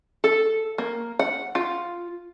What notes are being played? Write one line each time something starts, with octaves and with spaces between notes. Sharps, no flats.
A4
A#3
F#5
F4